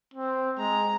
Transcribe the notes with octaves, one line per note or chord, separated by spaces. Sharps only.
C4
G#3 A#5